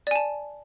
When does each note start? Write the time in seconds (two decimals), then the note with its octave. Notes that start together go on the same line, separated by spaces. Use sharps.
0.07 D5
0.11 G#5
0.15 A5